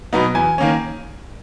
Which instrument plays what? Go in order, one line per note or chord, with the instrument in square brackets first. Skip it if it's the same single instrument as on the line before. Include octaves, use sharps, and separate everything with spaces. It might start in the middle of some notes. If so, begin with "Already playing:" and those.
[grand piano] B2 F#3 B3 D#4
E2 G#5
D#3 A#3 C#4